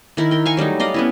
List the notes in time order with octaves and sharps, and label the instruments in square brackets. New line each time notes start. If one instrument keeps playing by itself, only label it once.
[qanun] D#3 E4 A#4
A#4 G5
F5 G#5 C#6
F#3 G3 A3 D#4
D5 D#5 F5
B3 C#4 E4